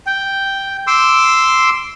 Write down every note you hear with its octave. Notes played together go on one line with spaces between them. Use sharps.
G5
C6 D6 E6